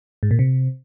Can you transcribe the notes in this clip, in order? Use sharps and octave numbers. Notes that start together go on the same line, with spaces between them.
G#2
A#2
C3